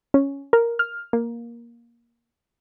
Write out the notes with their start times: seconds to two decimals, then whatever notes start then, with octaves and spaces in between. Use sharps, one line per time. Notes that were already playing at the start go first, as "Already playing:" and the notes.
0.14 C#4
0.53 A#4
0.79 F6
1.13 A#3